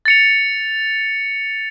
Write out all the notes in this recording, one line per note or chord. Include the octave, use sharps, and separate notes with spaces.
A6 C#7 F7